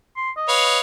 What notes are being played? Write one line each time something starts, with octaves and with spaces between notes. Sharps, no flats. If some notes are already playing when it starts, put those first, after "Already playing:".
C6
D#5
B4 C#5 F5